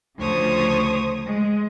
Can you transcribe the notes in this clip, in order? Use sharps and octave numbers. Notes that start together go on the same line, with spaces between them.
D2 C#3 F3 C5 C#5 D#6
G#3